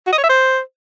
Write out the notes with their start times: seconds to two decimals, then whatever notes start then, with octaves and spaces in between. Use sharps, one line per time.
0.07 F#4
0.12 D#5
0.18 C#5
0.24 E5
0.29 C5